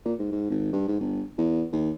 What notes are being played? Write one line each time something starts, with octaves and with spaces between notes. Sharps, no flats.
A#2
G#2
G#2
G#1
G2
G#2
G1
E2
D#2